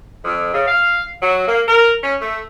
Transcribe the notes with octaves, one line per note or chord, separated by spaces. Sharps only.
F2
C#3
F5
F#3
A#3
A#4
C#4
A3